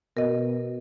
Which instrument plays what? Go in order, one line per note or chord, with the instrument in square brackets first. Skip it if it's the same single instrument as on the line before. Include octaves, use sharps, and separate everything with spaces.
[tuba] B2 [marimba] A#4 D#5